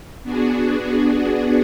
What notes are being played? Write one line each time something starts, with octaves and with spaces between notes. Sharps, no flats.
B3 D4 F#4 G#4